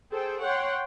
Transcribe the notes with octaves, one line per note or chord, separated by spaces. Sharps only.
G#4 A4 C5 G5
C#5 F#5 G5 C6